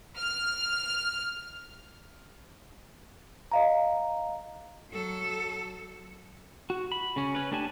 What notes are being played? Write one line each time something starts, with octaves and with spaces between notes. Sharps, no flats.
F6
D#5 F5 A#5
F#3 A4
F#4
B5
C#3 C#4
C#4 B4
A3 D4 G4 G#5 A5